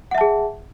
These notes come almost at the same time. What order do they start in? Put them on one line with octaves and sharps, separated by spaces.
F#5 E5 A5 G#4